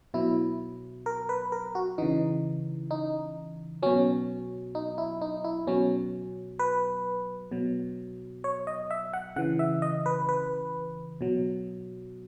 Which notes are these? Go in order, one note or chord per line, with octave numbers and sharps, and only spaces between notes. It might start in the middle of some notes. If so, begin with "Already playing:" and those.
B2 F#3 E4
A#4
B4
A#4
F#4
C#3 E3 D#4
D#4
B2 F#3 C#4
D#4
E4
D#4
E4
B2 F#3 C#4
B4
B2 F#3
C#5
D#5
E5
F#5
C#3 E3 F#5
E5
D#5
B4
B4
B2 F#3